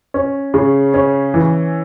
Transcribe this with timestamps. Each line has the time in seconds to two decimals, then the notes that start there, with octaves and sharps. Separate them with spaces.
0.14 C#4
0.54 C#3
0.94 C#4
1.34 E3